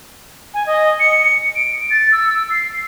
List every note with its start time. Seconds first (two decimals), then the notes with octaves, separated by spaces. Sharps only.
0.54 G#5
0.66 D#5
1.00 C#7
1.55 D7
1.90 A6
2.12 E6
2.50 C7